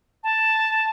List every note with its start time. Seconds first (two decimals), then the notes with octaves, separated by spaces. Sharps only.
0.24 A5